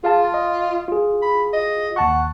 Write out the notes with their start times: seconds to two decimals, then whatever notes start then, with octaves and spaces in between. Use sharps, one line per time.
0.04 F4 G#4 F5 A5
0.34 D#5
0.88 F4 G#4
1.22 B5
1.53 D#5
1.96 D#2 F#5 A5 C#6